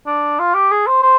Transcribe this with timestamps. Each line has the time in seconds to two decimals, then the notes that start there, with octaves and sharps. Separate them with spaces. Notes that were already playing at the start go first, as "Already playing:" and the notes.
0.07 D4
0.39 F4
0.54 G4
0.71 G#4
0.87 C5
1.03 C5